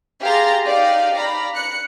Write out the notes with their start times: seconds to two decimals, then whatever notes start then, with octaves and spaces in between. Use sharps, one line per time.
0.22 G4 G#4 F5 A#5 C6 A6
0.65 D#4 G4 D5 F5
1.15 D5 F5 A#5 B5
1.55 F#6 C#7